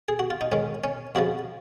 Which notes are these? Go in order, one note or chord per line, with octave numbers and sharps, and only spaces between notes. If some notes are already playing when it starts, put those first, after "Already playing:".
G#4
F#4
F4
D#4
G#2 D#3 C#4
C#4
F2 C#3 F3 F#4